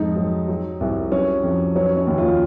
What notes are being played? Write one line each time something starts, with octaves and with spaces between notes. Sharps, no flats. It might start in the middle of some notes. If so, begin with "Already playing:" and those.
Already playing: F2 G#2 D#4
F#3
F#3
C2
F#3 C#4
F2
F#3 C#4
C#4
D#2
F4